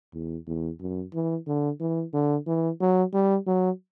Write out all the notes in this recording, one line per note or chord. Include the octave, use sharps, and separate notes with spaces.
E2
E2
F#2
E3
D3
E3
D3
E3
F#3
G3
F#3